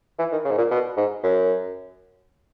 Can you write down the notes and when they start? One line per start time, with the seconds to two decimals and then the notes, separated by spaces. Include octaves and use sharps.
0.19 E3
0.32 D#3
0.45 C#3
0.51 G#2
0.58 A#2
0.71 B2
0.97 G#2
1.24 F#2